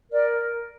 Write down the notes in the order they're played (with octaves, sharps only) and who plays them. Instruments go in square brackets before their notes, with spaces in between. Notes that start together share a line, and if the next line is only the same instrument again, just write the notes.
[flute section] A#4 D5